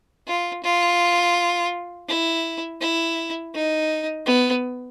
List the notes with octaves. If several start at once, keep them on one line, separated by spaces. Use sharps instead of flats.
F4
F4
E4
E4
D#4
B3